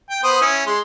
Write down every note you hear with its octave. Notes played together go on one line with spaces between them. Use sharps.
G5
B3 C5 D#6
C#4 E4
G#3 C6